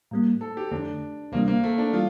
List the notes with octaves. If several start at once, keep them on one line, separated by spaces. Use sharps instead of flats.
A2 G3 A#3
A4
G4
F2 D3 A3 D4
D2 C3 E3 G3 A#3 D4
A#3
A3
D4
E3 G3 F4